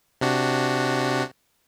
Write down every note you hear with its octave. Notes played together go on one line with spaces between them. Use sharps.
C3 D4 F#4